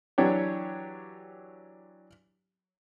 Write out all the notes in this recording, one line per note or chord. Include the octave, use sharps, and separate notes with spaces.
E3 F#3 D4 G4 C#5